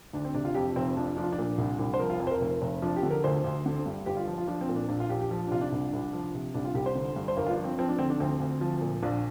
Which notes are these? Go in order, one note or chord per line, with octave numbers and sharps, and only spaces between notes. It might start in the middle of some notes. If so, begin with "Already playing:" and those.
D2 D4
C4
C3 D4
F4
F2 G4
F1 C4
F3 D4
F3 D4
F4
D4
A#2
C2
C2
C5
F3 A#4
F4
F2
C5
A#4
F1
F1
F3 D4
G4
D3
A#4
D2 C5
D2
D3
G2
G1 G4
F4
F3
F4
F3 D4
C4
A#2
D4
A#1 D4
F4
A#1 G4
G4
F3
D4
C3 F4
D4
C2
C2
F3
C3
C2 D4
F4
C2 G4
C5
D3
G2
C5
G1 A#4
F4
D4
F3
C4
F3 C4
D4
D3 C4
D4
D2 C4
D2
F3
A#2
A#1 D4